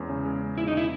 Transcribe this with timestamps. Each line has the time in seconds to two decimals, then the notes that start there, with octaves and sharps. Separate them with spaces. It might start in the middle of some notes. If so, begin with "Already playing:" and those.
Already playing: E2 G#3 C#4
0.09 C#3
0.25 G#3
0.42 C#4
0.58 E2 E4
0.68 D#4
0.74 C#3 E4